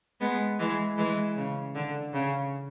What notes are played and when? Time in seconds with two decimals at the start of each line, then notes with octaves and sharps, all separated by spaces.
0.21 G#3 B3
0.59 E3 G#3
0.98 E3 G#3
1.36 C#3
1.75 D3
2.14 C#3